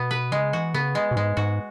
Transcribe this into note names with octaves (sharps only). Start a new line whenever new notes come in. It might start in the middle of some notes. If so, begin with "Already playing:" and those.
Already playing: B2 B3
B4
C#3 G#3
E3 F#4
C#3 B3
G#3
B2
G#2 G#3
G#2 F#4